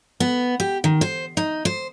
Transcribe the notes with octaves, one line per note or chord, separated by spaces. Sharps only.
B3
G4
D#3
C5
D#4
C5